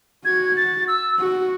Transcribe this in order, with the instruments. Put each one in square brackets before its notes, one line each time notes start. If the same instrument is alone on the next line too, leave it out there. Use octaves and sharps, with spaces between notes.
[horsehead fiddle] F#4 [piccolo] G#6
[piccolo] A6
E6
[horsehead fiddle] F#4